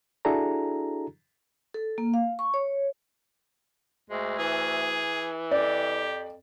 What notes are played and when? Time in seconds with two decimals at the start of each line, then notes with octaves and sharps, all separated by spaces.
0.25 D4 E4 F#4 G#4 A4 A#5
1.74 A4
1.98 A#3
2.14 F5
2.39 C#6
2.54 C#5
4.10 D2 G#3
4.38 E3 G#4
5.52 F2 G4 D5